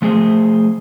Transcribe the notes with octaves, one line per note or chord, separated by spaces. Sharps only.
F3 A3 G#4 C5